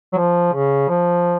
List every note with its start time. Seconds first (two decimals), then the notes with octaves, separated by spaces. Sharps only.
0.13 F#3
0.17 F3
0.53 C#3
0.88 F3